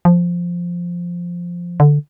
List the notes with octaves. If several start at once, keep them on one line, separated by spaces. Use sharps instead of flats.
F3
D3